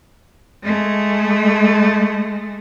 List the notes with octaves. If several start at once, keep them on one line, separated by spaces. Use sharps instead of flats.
G#3 A3